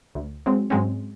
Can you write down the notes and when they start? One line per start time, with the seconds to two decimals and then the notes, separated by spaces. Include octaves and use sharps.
0.15 D2
0.46 F#3 G#3 C4
0.70 G#2 F#3 G#3 C4 C#4